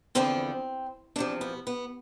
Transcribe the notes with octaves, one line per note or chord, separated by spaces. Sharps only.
E2 D3 F3 B3 C4
E2 C3 F3 D4
B3
B3